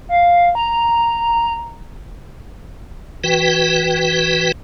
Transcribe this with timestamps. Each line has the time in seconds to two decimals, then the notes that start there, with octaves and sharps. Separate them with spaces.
0.09 F5
0.55 A#5
3.24 E3 F#4 B4 G5